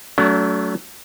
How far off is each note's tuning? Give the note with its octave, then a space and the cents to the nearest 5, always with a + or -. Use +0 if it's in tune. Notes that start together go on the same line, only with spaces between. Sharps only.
F#3 +15 A3 +0 D4 -45